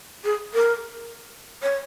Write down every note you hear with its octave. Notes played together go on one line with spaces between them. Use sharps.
G#4
A#4
C#5